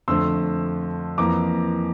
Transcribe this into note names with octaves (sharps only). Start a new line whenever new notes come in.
F2 D3 A3 C4 C6 E6
F2 E3 A#3 A#5 D6